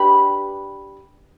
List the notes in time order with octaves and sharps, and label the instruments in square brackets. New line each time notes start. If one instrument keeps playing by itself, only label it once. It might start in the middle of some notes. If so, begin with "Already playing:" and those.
Already playing: [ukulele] D4 G4 B4 B5